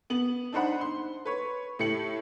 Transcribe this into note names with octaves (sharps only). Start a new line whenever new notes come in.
B3 F#7
D4 D#4 C5 F#5 B5
C6
B4 C#5
A2 G4 C#7 F#7